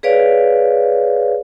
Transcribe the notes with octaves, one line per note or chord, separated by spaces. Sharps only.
G#4 B4 C#5 D5 F5